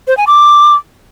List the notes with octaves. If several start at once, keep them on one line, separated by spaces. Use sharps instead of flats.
C5
G#5
D6